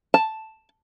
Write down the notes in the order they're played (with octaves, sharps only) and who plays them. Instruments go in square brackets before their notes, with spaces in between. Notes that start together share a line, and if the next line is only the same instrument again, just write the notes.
[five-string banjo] A5